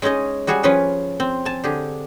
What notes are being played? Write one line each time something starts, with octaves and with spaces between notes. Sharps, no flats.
G#3 C#4 D#4 G#4 D#5
G3 F#4 G#4 F#5 G#5
F3 C#4 F4 G#4 B4 C#5
C4
G#5 A5
D3 G4 G#4